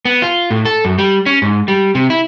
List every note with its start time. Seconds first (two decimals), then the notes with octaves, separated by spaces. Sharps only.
0.05 B3
0.22 F4
0.51 A2
0.65 A4
0.85 F#2
0.99 G3
1.26 C#4
1.42 G#2
1.68 G3
1.95 C3
2.10 E4